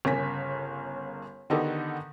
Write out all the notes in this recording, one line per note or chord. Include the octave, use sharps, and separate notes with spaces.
G1 C#3 A#4 G#5 B6
D3 D#3 B3 D#4 G4 A4